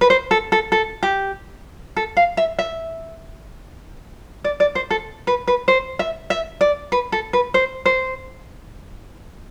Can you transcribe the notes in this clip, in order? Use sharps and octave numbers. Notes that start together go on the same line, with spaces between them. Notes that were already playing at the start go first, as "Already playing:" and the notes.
B4
C5
A4
A4
A4
G4
A4
F5
E5
E5
D5
D5
C5
A4
B4
B4
C5
E5
E5
D5
B4
A4
B4
C5
C5